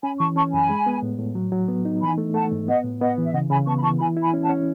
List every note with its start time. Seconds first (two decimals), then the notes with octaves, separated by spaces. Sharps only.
0.03 C#4 G#5 B5
0.20 E3 A5 C#6
0.36 C#4 A5 C#6
0.53 F#2 G#5 B5
0.70 G#3
0.86 B3
1.02 A2
1.19 A2
1.35 F#3
1.52 F#3
1.68 B3
1.85 D#4
2.01 E3 G#5 B5
2.18 A3
2.34 A3 F#5 A5
2.52 G#2
2.67 B3 D#5 F#5
2.84 A2
3.01 B3 D#5 F#5
3.18 E3 E5
3.33 C#3 D#5 F#5
3.50 C#3 G#5 B5
3.67 B3 A5 C#6
3.78 B5
3.83 E3 A5 C#6
3.99 E4 G#5 B5
4.17 E4
4.22 G#5 B5
4.34 C#4
4.44 F#5 A5
4.49 C#4